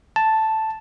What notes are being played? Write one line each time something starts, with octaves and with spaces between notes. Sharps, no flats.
A5